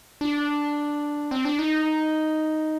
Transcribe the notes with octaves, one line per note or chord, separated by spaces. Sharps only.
D4
C4
D4
D#4